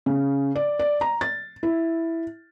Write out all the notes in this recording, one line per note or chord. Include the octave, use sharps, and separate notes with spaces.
C#3
D5
D5
A#5
A6
E4